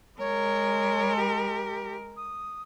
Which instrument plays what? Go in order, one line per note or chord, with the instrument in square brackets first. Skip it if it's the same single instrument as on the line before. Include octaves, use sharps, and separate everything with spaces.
[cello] G#3 A#4 [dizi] C#5
[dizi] G4
D#6